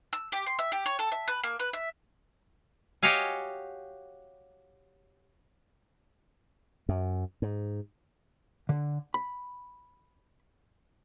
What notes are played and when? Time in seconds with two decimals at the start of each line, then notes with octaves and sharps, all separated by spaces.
0.13 E6
0.32 G4
0.46 C6
0.59 E5
0.72 G4
0.86 C#5
0.99 A4
1.12 E5
1.28 B4
1.43 A#3
1.60 B4
1.73 E5
3.03 F#4 G4 C#5 D#5 F5 G#5
6.89 F#2
7.42 G#2
8.69 D3
9.14 B5